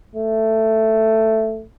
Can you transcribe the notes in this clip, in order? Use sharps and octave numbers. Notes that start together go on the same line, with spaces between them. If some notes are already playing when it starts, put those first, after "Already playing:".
A3